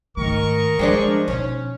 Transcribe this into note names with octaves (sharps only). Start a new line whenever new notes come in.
G#2 D#3 A3 A#4 D#5 C#6
F3 G#3 C#4 D4 D5
B2 C#4 D#4